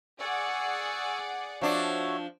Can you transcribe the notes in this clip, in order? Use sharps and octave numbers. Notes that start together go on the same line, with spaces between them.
G#4 D5 F#5 G#5 C#6 E6
F3 D4 F#4 C#5 E5